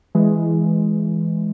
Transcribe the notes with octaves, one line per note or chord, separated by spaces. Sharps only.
E3 G#3